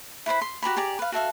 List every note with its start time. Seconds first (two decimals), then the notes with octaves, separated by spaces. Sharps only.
0.26 E4 B4 C5 B5
0.41 C6
0.62 F#4 G4 A#5 B5
0.77 G4 G#4 D5 A#5
0.99 B4 F5
1.12 F#4 A4 E5 F5